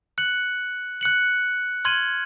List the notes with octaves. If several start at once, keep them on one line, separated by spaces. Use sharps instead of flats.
F#6 C#7 F#7
F#6 C#7 F#7
C6 F6 G#6 D#7 F#7